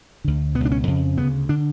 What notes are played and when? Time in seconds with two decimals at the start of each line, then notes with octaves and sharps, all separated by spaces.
0.24 D2 D3
0.55 B2 B3
0.60 C#2
0.65 D4
0.71 C#4
0.87 F2 C#3
1.17 D2 C#3 B3
1.49 D3 D4